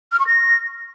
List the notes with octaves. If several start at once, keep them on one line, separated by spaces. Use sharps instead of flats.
F6
C#6
A#6